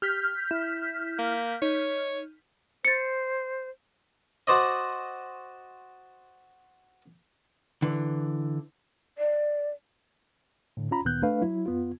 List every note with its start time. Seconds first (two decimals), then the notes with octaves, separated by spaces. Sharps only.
0.02 G4 F6 G6 B6
0.51 E4
1.19 A#3
1.62 D#4 C#5
2.85 C5 A6 C#7
4.47 F#4 C5 D5 D#5
7.82 D3 E3
9.18 D5
10.77 A2 D3
10.91 C#4 F4 A#5 B5
11.05 D2 A#2 D#3 B3 F#6 G6
11.22 A3 D4 B4 F5
11.42 F#3 E4
11.66 F2 B3 F4